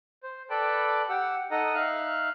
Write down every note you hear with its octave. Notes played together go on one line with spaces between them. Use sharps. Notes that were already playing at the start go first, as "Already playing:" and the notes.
C5
A4 B4 D5 G5 A5 B5
G4 F#5 E6
D#4 A4 D#5 F#5 A#5 D#6
D#4 E5 F5 F6 F#6